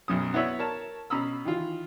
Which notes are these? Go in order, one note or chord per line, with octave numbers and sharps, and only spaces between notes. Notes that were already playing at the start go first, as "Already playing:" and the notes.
B1 F#2 C#4 D#6
B3 E4 F#4 C#5 E5
A#4 C#5 A5
B2 C#4 A#5 B5 D#6 E6
D#3 E3 F4